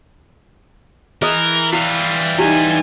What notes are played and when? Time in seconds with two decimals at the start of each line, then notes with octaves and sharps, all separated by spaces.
1.22 E3 G#4 A#4 D#5 D#6
1.73 G3 E4 F4
2.38 D#4 E4 G4 G#5